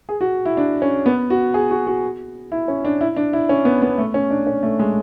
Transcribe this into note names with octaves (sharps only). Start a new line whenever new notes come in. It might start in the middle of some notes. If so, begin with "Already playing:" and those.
G#4
F#4
E4
D4
C#4
B3
F#4
G#4
F#4
F#4
E4
C#4
D4
E4
D4
E4
C#4
B3
B3
A3
C#4
D4
C#4
A3
G#3